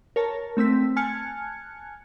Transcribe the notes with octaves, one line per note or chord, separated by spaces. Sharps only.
A#4 C#5 A5
A3 C4 E6 B6
G#5 A5 F6 F#6 G#6 C#7